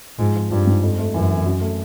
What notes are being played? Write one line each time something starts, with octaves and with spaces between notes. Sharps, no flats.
G#2 F3
F3
G2 F3
G#2
F2
A3
F#2 E3
E3
F#2
A3